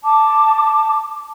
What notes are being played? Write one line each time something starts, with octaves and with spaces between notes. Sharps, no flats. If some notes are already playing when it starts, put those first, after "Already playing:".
A5 D6